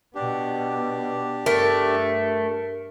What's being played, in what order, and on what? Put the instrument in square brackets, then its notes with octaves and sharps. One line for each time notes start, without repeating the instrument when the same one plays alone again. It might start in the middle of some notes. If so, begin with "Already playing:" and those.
[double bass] B2 B3 [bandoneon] D4 G4
[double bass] G2 [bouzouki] A3 [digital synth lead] A#4